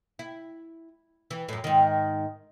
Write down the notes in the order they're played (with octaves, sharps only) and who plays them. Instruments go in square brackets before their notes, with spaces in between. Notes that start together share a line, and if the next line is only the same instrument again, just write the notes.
[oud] E4
E3
F#2 A2
G#2 D#3